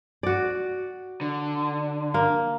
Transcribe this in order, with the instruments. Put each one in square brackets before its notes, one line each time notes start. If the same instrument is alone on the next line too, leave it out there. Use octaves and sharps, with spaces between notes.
[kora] F#4 D5
[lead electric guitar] D3
[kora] A#3